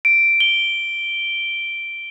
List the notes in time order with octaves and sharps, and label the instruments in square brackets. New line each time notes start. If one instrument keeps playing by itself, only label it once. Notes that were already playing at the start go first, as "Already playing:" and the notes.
[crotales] D7
G7